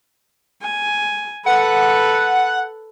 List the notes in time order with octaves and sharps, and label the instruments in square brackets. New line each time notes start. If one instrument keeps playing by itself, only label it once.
[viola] G#5
[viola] A4 B4 [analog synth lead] F#5